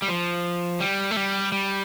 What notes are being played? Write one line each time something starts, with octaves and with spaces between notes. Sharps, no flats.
G3
F3
G3
A3
G3
G3